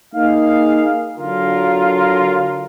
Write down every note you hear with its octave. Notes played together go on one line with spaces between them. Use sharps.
A#3 D#4 G#4 F5
D3 F#3 F4 A#4